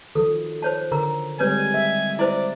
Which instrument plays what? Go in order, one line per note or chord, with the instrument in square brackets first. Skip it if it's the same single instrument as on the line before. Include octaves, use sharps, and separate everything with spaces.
[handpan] D#3 F3 F#3 [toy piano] A4
[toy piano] C5 C#5 A5
[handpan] D3 [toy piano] A#4 A#5
[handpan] G3 G#3 C4 [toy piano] B4 C#5 [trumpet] G#5
[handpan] E5
[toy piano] E4 C5 [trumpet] D5